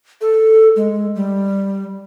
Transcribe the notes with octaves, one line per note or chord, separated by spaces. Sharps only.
A4
G#3
G3